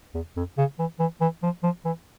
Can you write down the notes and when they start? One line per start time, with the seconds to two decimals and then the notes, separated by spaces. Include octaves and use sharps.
0.14 E2
0.36 F2
0.58 C#3
0.79 E3
0.99 E3
1.21 E3
1.43 F3
1.63 F3
1.85 E3